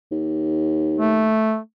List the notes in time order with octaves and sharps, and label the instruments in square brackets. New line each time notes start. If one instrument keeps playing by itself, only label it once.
[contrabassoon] D#2
[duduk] A3